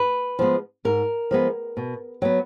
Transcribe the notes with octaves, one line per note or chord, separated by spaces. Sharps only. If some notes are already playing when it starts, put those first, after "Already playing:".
Already playing: B4
F3 G#3 B3
G#2 A#4
F3 G#3 B3
B2
F#3 B3